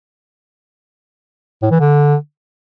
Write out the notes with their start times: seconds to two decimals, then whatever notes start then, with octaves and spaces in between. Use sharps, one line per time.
1.62 A2
1.71 E3
1.80 D3